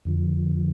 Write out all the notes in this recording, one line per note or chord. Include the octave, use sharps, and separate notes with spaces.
F2 D3 F3